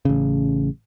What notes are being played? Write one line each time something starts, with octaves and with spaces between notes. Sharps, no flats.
A1 C#3